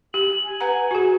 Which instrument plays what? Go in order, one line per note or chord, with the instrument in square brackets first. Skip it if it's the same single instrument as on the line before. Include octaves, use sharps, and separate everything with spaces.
[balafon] G4 [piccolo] F#7
[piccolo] G#5
[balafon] B4 F#5 A#5
F#4 G#4